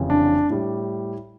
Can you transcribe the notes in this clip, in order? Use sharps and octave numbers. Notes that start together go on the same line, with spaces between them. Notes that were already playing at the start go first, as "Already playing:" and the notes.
Already playing: F1 F2 C#3 E3
D4
A2 G3